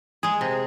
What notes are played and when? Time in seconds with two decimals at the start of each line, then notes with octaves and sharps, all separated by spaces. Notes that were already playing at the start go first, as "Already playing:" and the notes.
0.23 G#3 G#4
0.41 C3